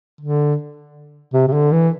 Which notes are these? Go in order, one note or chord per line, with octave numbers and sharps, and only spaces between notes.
D3
C3
C3
D3
E3